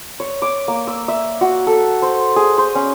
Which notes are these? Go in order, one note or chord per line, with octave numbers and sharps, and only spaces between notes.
C#5
D6
A#3
E6
E5
F#4
A4
C5
G#4
C5
C#4